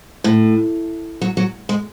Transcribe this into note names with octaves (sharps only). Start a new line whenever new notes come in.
A2
F#3
F#3
G#3